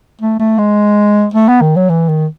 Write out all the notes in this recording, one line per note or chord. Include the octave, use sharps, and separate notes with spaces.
A3
A3
G#3
A3
B3
D#3
F#3
E3
D#3